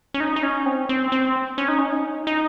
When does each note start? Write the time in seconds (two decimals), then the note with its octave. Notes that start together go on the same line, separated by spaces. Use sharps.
0.14 C#4
0.20 D#4
0.36 D#4
0.43 C#4
0.66 C4
0.89 C4
1.12 C4
1.58 C#4
1.68 D#4
1.78 C#4
1.92 D#4
2.27 D#4